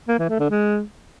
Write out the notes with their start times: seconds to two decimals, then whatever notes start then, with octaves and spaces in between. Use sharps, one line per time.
0.08 A#3
0.19 E3
0.29 A3
0.40 D3
0.50 G#3